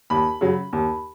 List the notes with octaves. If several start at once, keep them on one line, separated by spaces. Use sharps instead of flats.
D#2 B5
C#3 F#3
D#2